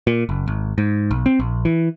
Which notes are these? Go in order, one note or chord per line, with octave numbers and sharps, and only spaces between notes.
A#2
F#1
G#1
G#2
B1
C4
A#1
E3